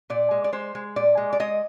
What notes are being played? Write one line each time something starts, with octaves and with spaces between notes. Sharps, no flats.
A#2 D5
G#3
D5
G#3 C5
G#3
A#2 D5
G#3
D5
G#3 D#5